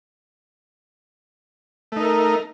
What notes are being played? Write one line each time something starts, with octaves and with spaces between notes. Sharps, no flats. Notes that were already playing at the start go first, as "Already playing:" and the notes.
A3 D#4 A#4